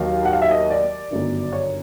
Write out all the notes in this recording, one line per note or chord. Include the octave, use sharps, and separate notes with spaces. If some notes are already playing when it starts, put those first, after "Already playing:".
Already playing: D#2 D#3 F#3 A#3 F5
F#5
F5
E5
D#5
D5
G1 F#2 D#3
C#5